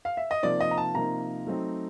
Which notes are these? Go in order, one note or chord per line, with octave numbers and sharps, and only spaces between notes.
F5
E5
D#5
C3 F3 A#3 D#4 D5
D#5
A#5
A5
C3 F3 A#3 D#4 A#5
F#3 A3 C4 D#4